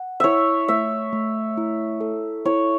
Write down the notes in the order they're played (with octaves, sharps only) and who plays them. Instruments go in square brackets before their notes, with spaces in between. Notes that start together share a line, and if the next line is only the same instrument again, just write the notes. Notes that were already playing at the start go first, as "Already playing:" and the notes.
Already playing: [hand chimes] F#5
[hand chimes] E4 [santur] C#5 E5
[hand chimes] A3 [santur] E5
[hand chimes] A3
E4
A4
[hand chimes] E4 [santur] C#5